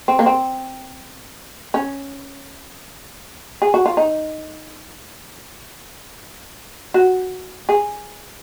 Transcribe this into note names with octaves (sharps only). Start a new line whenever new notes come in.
C4
A#3
C4
C#4
G#4
F#4
F4
D#4
F#4
G#4